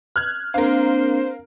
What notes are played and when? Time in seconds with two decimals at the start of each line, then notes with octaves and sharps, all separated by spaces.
0.16 F6 F#6 G#6
0.54 A#3 C4 D4 A#4 C5 F5